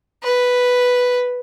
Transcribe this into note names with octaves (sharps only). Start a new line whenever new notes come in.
B4